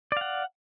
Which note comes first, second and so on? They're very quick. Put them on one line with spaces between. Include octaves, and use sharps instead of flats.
D5 F5 F#5